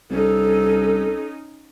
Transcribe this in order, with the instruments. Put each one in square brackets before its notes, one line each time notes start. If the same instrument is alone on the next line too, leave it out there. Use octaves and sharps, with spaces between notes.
[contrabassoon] C2 [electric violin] C#4 D#4 [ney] A4